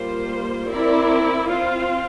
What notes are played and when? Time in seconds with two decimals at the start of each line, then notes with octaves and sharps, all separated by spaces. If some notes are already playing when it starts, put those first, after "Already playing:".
Already playing: G3 A#3 F4 C5
0.69 C4 E4 A#4 D5
1.48 C4 F4 C5